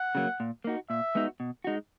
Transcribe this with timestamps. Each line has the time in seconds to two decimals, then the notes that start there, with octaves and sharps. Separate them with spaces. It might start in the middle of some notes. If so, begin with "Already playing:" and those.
Already playing: F#5
0.15 C#3 F#3 A#3
0.40 A#2
0.64 A#3 D#4 F#4
0.90 A#2 E5
1.15 G#3 B3 D#4 F#4
1.40 B2
1.64 G#3 D#4 F#4